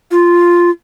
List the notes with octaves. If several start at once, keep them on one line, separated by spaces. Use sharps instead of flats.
F4